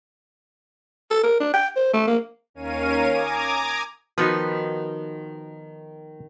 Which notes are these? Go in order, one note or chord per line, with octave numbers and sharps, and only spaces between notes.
A4
A#4
D4
G5
C5
A3
A#3
D#2 C#4 A#4 C#5 F5 D#7
G#5 A#5 D6 D#6 G#6
D#3 F3 B3 D#4 F#4 B4